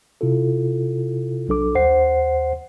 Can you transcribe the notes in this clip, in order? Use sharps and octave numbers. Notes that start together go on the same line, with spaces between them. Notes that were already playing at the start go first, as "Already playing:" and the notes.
C3 E4 F4 A4
B1 F#3 D4 A4 D6
D#2 C5 F#5 C7